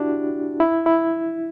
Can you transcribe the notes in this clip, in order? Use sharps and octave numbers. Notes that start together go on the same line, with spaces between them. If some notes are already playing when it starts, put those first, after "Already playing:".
Already playing: D4 E4 F#4 G4
E4
E4